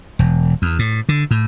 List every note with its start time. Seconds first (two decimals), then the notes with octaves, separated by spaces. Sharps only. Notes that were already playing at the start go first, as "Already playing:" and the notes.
0.19 E1
0.62 E2
0.79 A2
1.09 D3
1.31 A2